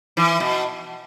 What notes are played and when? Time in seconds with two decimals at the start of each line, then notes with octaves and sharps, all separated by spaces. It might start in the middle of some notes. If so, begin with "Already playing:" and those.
0.17 E3
0.40 B2